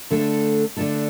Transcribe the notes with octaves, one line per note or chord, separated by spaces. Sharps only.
D3 A3 D4 A4
D3 A3 D4 A4